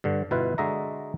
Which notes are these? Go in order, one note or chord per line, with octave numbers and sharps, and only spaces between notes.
G2 D3
G1 B2 E4 F4 B4 F5
D3 G#3 F#4 D#5 E5 A#5